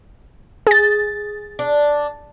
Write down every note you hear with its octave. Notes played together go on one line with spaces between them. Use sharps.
G#4 A6
D4